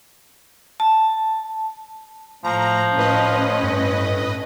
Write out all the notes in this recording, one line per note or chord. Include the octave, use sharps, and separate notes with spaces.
A5
A2 F3 A#5
A2 C#4 B4 D#5
G2